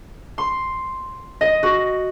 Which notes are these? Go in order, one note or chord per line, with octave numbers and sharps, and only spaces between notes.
C6
D#5
F#4